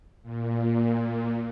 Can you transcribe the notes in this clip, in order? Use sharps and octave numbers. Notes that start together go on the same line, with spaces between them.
A#2